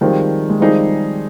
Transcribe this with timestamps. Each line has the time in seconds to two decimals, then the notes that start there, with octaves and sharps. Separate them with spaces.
0.01 D#3 F3 G3 G#3 C4 G4
0.50 G#3
0.60 D#3 F3 G3 C4 D#4 G#4